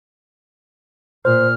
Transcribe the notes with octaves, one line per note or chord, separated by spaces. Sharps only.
A#2 C5 F6